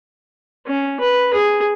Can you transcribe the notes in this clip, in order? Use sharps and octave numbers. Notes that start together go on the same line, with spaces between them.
C#4
B4
G#4